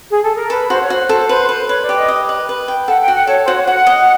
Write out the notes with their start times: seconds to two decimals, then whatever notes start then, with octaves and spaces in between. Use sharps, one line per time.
0.10 G#4
0.23 A4
0.36 A#4
0.50 A4 B4
0.69 F#4 C5
0.82 C#5
0.90 F#4 C5
1.09 A4
1.29 B4 C5
1.49 B4 C5
1.68 B4 C#5
1.82 D5
1.89 G4
1.96 D#5
2.08 D#5
2.29 B4
2.49 B4
2.68 G5
2.88 A4 F#5
3.01 G5
3.08 F#4
3.15 F#5
3.27 A4 C#5
3.45 F#4 C5
3.54 C#5
3.67 F#4 F#5
3.87 D#5